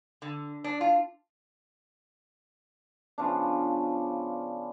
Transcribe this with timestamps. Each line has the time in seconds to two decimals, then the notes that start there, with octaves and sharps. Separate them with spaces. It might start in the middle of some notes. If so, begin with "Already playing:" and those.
0.22 D3
0.64 D4
0.81 F4
3.18 C#3 F3 B3 D4